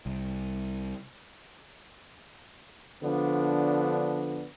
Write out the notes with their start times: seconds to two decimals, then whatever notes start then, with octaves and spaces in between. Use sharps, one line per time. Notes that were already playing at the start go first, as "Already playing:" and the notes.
0.06 C2
3.01 D3 F3 B3 D4